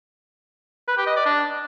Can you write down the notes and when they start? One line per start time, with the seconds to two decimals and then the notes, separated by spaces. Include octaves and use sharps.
0.88 B4
0.97 G4
1.07 D#5
1.16 D5
1.26 D4